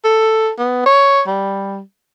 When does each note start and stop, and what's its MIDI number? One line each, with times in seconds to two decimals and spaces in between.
0.05 0.51 69
0.59 0.85 59
0.86 1.22 73
1.27 1.79 55